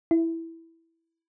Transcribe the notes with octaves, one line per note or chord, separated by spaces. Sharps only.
E4